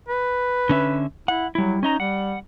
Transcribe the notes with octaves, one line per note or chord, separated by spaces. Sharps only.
B4
D3 C#4 E5
E4 F#5
F#3 G3 E4
C#4 D#4 D#5 A#5
G3 F#5